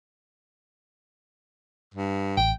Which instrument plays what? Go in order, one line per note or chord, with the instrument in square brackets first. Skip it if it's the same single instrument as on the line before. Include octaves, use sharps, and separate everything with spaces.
[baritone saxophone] G2
[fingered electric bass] A1 [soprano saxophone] G5